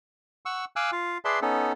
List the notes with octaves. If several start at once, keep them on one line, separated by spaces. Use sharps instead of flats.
F#5 C#6 E6
F5 G#5 D6 E6 F#6
F4 F5
G#4 B4 D5 E5 A5 C6
B3 C#4 D#4 A4